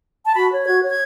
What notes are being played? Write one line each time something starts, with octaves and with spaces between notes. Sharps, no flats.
A5
F#4 B5
C#5
F#4 G#6
C#5
G#6